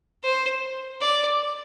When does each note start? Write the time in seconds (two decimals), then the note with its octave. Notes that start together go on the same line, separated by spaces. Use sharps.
0.23 C5
1.01 D5